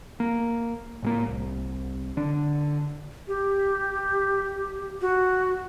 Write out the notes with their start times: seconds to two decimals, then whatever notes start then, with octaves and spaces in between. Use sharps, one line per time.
0.20 A#3
1.02 A2 G#3 A#3
1.26 C2
2.17 D3 D4
3.28 G4
5.01 F#4